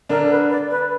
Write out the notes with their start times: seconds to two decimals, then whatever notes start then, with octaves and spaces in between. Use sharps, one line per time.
0.09 D3 D4 A#4
0.30 B4
0.50 D5
0.71 B4